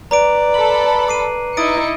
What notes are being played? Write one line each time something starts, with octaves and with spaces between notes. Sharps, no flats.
B4 D5 A#5 D6 D7
A4 B5 F#7
D6 C7 D#7
D#4 E4 D#5 D#6 A6 C#7 D7